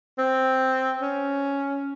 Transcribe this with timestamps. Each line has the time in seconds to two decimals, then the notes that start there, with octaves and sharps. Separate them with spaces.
0.18 C4
1.02 C#4